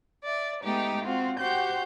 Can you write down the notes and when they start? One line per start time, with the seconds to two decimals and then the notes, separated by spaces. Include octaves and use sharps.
0.24 D5 E5
0.62 G#3 A3 B3 D#4 G4
1.05 C4 F4 F#4
1.37 F#4 G4 C5 G6